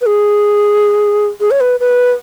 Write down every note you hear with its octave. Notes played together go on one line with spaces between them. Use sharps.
B4
G#4
G#4
C#5
B4
B4